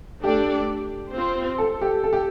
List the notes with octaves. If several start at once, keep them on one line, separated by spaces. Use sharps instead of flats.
A3 D4 G4 A4 D5
C4 F4 C5
A4
G4
A4
G4